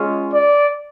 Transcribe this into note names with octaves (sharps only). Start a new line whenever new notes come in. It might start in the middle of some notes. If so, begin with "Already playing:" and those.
Already playing: G#3 C#4 F4
D5